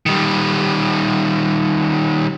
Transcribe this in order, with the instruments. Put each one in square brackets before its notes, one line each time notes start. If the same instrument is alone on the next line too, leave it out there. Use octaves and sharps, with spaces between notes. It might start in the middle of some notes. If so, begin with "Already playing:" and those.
[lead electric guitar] D#3 G3